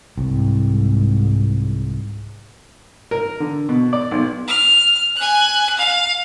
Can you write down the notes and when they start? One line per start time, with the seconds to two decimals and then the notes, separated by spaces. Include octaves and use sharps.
0.18 C2 G#2
3.11 A#4
3.40 D3
3.69 B2
3.93 D5
4.11 B1
4.48 F6
5.17 G#5 F#6
5.78 F5